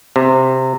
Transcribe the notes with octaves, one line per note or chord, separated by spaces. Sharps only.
C3